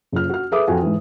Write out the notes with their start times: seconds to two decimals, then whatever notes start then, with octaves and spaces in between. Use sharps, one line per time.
0.12 F#1 F4 F6
0.30 F#4 F6
0.52 G#4 A4 B4 E5 D6 D#6
0.67 F2 F#4 G#5
0.82 G#2 E3